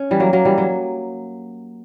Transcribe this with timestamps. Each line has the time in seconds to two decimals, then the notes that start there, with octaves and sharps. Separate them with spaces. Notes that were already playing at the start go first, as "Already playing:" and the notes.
Already playing: C#4
0.11 E3 G3
0.20 F#3 A#3
0.33 F#3 A#3
0.45 E3 G3
0.58 F#3